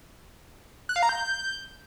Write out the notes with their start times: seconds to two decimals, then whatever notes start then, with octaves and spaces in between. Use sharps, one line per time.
0.89 F#6
0.96 F5
1.03 A#5
1.09 G6